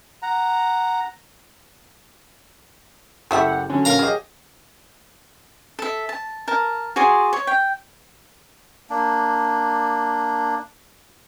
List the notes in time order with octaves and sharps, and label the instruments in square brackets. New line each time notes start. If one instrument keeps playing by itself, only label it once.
[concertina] F#5 A#5
[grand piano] F#1 G4 [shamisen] A3 E4 E5 [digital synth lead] F#5
[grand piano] D3 F#3 [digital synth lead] C#4
[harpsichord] A#4 F5 A#5
[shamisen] F#3 [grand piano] G4 G#4 D#5
[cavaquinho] A4 E5
A5
A#4 A5
F#4 G#4 D5 C6
C#5
G5
[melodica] A#3 D4